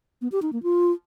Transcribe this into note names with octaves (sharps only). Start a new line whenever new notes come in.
B3
G4
D#4
A#3
F4